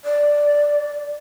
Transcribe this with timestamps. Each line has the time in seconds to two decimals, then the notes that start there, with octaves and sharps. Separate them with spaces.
0.05 D5